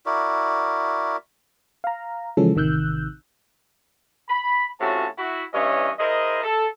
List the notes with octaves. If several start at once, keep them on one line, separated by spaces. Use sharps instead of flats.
E4 F#4 A#4 D5
F5 A#5
C#3 E3 F3 G#3 C#4 A4
A1 C3 D#3 E6 F#6 G6
B5
A2 C3 C#4 F4 F#4 A5
E4 F#4
G2 E3 C#4 C#5 D#5 E5
E4 G#4 A#4 C5 D#5
A4